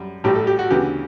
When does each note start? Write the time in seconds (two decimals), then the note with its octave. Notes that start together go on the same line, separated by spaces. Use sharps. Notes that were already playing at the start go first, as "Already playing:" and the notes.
Already playing: F#2 G3
0.24 A1 A2 G3 G4
0.35 A4
0.47 G4
0.59 F#4
0.70 D2 C#3 E3 B3 G4